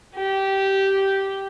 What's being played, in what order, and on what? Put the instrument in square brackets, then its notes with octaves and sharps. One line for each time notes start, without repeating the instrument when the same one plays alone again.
[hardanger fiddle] G4